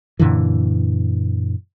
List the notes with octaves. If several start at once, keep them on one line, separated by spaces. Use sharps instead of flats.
F#2 A#2 D3 E3